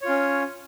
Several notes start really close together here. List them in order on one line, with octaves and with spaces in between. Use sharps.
C#5 F4 C#4